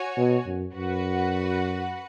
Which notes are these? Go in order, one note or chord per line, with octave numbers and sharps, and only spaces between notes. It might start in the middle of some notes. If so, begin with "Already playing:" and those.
Already playing: F#4 C#5 G#5
B2
F#2
F#2 F#4 B4 F#5